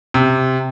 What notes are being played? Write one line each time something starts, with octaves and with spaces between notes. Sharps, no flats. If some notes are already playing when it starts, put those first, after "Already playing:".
C3